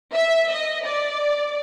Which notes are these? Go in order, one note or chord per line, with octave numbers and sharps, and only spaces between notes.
E5
D#5
D5